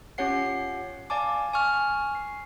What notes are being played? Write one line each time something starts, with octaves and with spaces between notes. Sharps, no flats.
C#4 F4 G4 C#5 F#5 C7
D5 F5 G#5 A5 D6
G#5 C#6 F6
C7